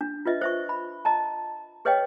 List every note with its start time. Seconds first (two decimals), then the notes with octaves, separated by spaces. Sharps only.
0.01 D4
0.25 F4 B4 D#5 E5
0.41 C5 E5 C#6
0.69 B5
1.05 D#5 A5 A#5
1.85 G#4 B4 C#5 D#5 F5 G5